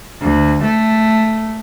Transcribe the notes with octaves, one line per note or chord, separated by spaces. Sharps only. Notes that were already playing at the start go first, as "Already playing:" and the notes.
D2
A3